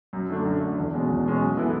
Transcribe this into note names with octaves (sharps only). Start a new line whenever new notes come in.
F#2
D3 A3 D4
F#2
D3 A3 D4
E2
B2 G#3 C#4
E2
B2 G#3 C#4
F#2
E3 B3 E4 A4